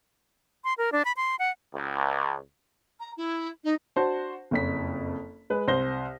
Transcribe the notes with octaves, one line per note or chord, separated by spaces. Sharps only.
C6
A#4
D4
B5
C6
F#5
C#2
A#5
E4
D#4
D4 F#4 C5 A5
F#1 F2 B6
G#3 B4
C2 C5 A#6 G7